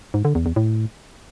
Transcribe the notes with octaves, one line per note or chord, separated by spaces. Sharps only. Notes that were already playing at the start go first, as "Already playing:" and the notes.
G#2
D3
E2
E2
A2